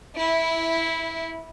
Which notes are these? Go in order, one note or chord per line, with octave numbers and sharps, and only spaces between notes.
E4